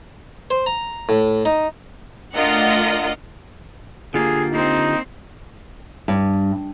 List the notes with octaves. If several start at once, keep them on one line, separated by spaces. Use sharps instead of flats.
C5
A#5
A2
D#4
A3 D4 F4 A#4 D#5 F#5
D3 A#3 F4 G4 G#4
A#3 C4 D#4
G2